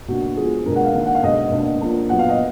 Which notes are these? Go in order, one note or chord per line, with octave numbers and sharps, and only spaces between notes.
B2 A#3 D4 F#4
F3 G#3 B3 G#4
B2 G#3 D4 A#4
F#5
F5
D#3 A#3 D4
F#5
F5
B2 G#3 D4 D#5
B2 A#3 D4
F3 A#3 D4
A#2 F#3 B3 F#5
F5
D#5